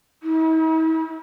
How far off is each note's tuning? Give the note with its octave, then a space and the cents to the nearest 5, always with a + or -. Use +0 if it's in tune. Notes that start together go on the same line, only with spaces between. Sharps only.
E4 -45